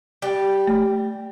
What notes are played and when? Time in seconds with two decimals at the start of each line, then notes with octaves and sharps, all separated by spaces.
0.22 G3
0.67 A3